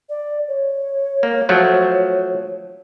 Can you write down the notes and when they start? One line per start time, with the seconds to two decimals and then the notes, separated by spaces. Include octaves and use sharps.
0.09 D5
0.48 C#5
1.23 A#3
1.49 F3 F#3 A3